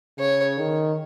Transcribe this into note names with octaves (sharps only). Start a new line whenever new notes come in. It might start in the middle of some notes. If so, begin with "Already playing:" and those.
C#3 C#5
D#3